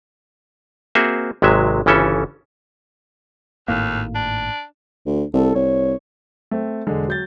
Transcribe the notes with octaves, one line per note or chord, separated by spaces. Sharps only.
A#3 C4 F#4 G#4 C5 E5
G#1 C3 F#3 G#3 E5
G1 C#3 E3 C#4 A4 E5
G#1 D#2 A2 A#3
D4
D2
C2 A4
C2 C#5
A3 C4
E1 D3 G#3
F#3 G6 A6